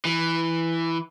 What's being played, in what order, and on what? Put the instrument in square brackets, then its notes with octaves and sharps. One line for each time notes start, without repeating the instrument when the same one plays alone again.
[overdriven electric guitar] E3